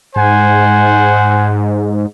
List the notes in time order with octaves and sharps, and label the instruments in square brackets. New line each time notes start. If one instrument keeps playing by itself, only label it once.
[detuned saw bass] G#2 [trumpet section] C5 F#5 G#5